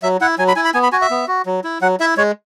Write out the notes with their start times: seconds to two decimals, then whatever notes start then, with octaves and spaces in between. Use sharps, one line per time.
0.03 F#3 E5
0.21 E4 F#5
0.38 F#3 G#5
0.48 B5
0.56 E4 G#5
0.65 B5
0.74 B3 G#5
0.83 B5
0.92 F#4 G#5
1.02 E5
1.10 B3
1.28 F#4
1.46 F#3
1.64 E4
1.81 F#3 F#5
2.00 E4 E5
2.17 G#3 C#5